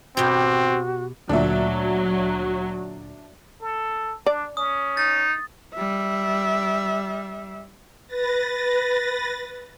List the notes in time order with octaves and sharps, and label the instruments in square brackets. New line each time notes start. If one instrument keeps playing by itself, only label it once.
[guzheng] B2 G4 [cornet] C4 [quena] F#4
[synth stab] D2 A#2 [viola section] F#3 [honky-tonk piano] D4 E5
[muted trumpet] A4
[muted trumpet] D4 [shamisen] D5
[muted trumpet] C#4 [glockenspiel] D#6
[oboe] D#4 [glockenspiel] A6
[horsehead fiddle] G3 E5
[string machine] B4 A6 A#6